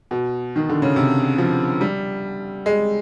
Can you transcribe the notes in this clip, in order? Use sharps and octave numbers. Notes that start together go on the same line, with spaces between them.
B2
D#3
D3
C#3
C3
F3
G3
G#3